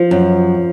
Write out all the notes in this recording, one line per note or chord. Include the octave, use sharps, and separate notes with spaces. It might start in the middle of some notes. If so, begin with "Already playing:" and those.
Already playing: F3
F#2